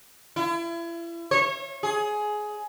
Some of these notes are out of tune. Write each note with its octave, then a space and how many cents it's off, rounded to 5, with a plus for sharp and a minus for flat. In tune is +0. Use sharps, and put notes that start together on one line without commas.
E4 +35
C#5 -35
G#4 +15